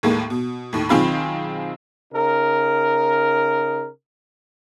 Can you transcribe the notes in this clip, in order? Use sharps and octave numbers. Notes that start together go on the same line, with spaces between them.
D#2 A2 G#3 A#3
B2
D#2 A2
B1 D#3 C4 F4 G#4 B5
C#3 D#4 A#4